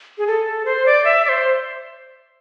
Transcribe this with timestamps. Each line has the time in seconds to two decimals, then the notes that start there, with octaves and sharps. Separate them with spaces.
0.18 G#4
0.27 A4
0.65 C5
0.86 D5
1.05 E5
1.25 D5
1.29 C5